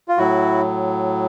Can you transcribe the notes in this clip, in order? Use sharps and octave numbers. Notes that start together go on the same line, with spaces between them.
F4
A2 F#3 E4 F#4